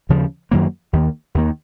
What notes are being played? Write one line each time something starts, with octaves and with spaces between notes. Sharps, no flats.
D#2 C#3 F3
F#2 D#3 F#3 A#3
D#2 D#3 A#3
D#2 D#3 A#3